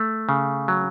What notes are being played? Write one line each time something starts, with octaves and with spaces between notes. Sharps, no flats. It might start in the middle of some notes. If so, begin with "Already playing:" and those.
Already playing: A3
C#3
F#3